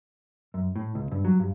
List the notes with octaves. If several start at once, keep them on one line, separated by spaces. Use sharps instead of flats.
F#2
A2
C#2
G2
F#3
G2